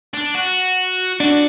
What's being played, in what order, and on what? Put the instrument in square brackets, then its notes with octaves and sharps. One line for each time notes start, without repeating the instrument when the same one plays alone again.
[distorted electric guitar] D4
F#4
[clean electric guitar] D4 [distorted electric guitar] F#4